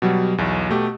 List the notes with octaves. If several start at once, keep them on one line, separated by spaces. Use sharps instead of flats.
B2 F#3 G3
B1 E2
B2 A3 G4